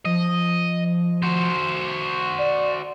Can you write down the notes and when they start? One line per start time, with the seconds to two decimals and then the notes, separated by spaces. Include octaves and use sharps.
0.05 F3 D#5
1.22 F#4 C5
2.38 D5